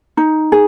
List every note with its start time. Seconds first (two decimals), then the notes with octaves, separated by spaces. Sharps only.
0.17 D#4
0.52 G#4